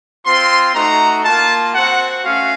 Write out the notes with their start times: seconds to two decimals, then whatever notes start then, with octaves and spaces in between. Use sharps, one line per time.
0.25 C4 F4 C6
0.74 A3 D#4 F#4 A#5
1.24 A#3 F4 A5
1.74 C4 F#4 F#5
2.24 A3 C#4 F#4 F5